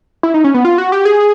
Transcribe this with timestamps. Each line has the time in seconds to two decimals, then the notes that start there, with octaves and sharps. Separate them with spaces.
0.23 E4
0.34 D#4
0.44 C#4
0.54 B3
0.65 F4
0.78 F#4
0.92 G4
1.05 G#4